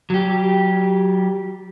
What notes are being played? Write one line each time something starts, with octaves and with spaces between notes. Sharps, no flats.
F#3 G4